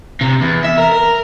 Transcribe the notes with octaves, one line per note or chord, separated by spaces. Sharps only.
C3
E2
E5
A#4
A#4